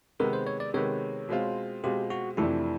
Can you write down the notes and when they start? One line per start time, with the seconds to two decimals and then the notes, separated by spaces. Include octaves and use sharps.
0.19 C3 D#3 G#3 B3 A#4
0.33 C5
0.47 C#5
0.60 D5
0.74 C3 D#3 G#3 B3 C#5
1.29 B2 G#3 C4 F4
1.84 B2 G#3 C4 F4 G4
2.10 F#4
2.37 F2 C3 E3 A3 D4 E4